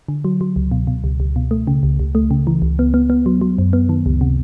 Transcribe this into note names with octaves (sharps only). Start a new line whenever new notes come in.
D3
F#3
F#3
C#2
B2
B2
C#2
C#2
B2
A3
C#3
C#2
C#2
A3
C#3
E3
C#2
B3
B3
B3
F#3
F#3
F#2
B3
D#3
C#2
C3